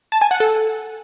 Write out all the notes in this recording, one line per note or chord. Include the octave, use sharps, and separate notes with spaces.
A5
G#5
F#5
A4